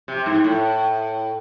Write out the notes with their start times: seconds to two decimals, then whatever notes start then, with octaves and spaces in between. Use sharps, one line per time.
0.08 C3
0.26 G#2
0.44 A2